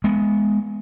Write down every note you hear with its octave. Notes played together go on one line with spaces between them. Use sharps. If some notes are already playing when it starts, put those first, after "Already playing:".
G#3 B3